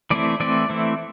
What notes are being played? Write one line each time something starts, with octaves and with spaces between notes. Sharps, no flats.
E3 A3 C4 E4 D5
E3 A3 C4 E4 D5
E3 A3 C4 E4